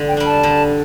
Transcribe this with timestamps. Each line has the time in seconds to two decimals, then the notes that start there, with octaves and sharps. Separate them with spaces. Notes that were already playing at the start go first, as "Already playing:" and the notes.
Already playing: D3
0.08 G5
0.17 G3 D4
0.26 A5
0.43 D3